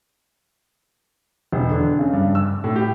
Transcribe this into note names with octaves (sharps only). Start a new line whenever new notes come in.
E1
D3
C#3
G2
E6
A2
G4